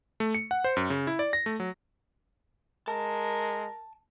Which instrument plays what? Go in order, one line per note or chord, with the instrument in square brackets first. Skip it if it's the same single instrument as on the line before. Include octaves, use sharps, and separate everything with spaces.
[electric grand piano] A3
C#7
F#5
C5
F#2
C#3
E4
D5
A#6
A3
F#3
[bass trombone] G#3 [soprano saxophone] A#4 [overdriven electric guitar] A5